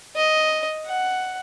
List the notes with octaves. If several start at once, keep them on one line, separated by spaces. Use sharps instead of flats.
D#5
F#5